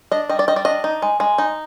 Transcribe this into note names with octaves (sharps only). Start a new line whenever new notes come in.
D4 D#5
G3 D#5
D5
G3 D#5
D5
D4 D#5
D#4
G#3
G#3
D#4